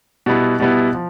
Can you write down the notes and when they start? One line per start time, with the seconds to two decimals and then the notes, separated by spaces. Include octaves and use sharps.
0.26 B2 G3 B3 E4
0.60 B2 G3 B3 E4
0.94 F3